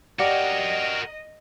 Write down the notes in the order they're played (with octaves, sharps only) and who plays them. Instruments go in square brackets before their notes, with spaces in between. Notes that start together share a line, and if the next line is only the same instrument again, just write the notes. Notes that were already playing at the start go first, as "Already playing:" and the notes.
[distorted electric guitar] F#4 A#4 [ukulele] G4 D5 F#5 [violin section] D#5